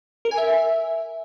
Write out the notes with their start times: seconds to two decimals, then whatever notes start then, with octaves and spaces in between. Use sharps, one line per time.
0.25 A#4
0.31 G#5
0.37 E5